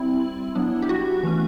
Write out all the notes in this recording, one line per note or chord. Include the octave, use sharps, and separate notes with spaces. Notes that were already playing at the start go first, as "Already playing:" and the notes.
Already playing: G3 C4 E4
F#3 B3 D4
G4
F#4
E3 A3 C#4